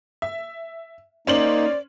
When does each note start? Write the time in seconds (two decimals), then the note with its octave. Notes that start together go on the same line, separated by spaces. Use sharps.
0.22 E5
1.27 A#3 C#4 D#4 C5 D5 F#7